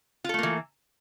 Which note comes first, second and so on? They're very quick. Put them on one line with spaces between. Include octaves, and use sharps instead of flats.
F4 A4 A3 A#3 E3